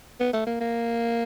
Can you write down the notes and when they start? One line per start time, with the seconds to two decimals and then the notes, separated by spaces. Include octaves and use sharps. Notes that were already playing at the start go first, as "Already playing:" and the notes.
0.20 B3
0.33 A3
0.46 A#3
0.60 A#3